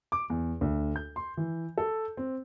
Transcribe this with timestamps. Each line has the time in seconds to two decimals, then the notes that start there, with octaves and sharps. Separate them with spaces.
0.12 D6
0.30 E2
0.61 D2
0.96 G6
1.16 C6
1.37 E3
1.78 A4
2.17 C4